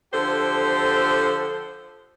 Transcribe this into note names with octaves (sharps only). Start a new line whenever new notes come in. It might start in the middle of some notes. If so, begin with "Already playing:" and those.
D3 F3 G4 A4 C5